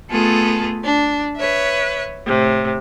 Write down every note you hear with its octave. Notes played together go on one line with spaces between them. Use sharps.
A3 B3 F4 G#4 A4
D4
B4 C#5 E5
A2 C3